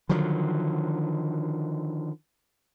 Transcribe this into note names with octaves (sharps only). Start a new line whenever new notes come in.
D3 D#3 F3 F#3